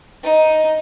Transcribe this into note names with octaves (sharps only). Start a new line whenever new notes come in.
D#4